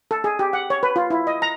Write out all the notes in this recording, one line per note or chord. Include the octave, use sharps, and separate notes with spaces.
A4
G#4
G4
F#5
C#5
B4
F4
E4
D#5
A#5